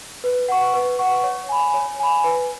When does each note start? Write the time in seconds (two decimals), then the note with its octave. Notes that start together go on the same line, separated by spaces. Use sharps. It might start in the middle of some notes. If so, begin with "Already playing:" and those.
0.24 B4
0.49 F#5 C#6
0.74 B4
0.99 F#5 C#6
1.23 C#5
1.49 G#5 B5
1.74 C#5
2.00 G#5 B5
2.24 B4